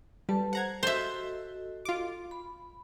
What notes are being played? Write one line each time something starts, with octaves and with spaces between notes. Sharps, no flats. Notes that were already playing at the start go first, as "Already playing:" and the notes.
G3 A4 B4 A5
C5 F#5 A#5 G#6
F#4 A4 C5 D#5 E5
F4 D6
B5